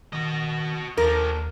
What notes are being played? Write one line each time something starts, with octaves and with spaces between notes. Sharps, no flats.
D#3 F#4 D#5
D#2 F3 D4 A#4